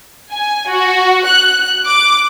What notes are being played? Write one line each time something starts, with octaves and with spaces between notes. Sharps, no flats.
G#5
F#4
F#6
D6